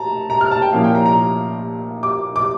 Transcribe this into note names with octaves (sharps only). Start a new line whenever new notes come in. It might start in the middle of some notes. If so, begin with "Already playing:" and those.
Already playing: A5 A#5
A#5
F6
A5
G5
A#2 F3 A#3 C#4 E4 F5
G5
A#5
A#5
D6
D6